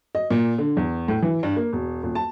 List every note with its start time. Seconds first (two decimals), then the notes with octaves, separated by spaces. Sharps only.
0.15 D#5
0.30 A#2
0.58 D3
0.77 E2
1.08 A2
1.22 E3
1.43 G2
1.56 A#3
1.73 E1
2.03 D#1
2.15 A5